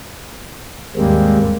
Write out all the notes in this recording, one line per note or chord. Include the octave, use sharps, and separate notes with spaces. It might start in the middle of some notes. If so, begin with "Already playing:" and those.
D#2 G#2 G3 G#3 A#3 C4